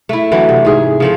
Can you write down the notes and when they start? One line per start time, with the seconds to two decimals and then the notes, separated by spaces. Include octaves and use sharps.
0.09 A3 E4
0.31 D3 E3 F#3
0.49 C3
0.65 G#2 G#4
1.00 C#3 F3 A4